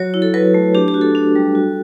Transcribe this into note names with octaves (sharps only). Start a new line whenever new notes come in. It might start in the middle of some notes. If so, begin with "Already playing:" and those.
Already playing: F#3 F#4 C#5
E4
A4
F#3 B4
A3
D4 G4
G4
F#4
A4
D4
G3
F#4